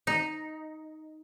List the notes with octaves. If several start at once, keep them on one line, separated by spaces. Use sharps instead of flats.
D#4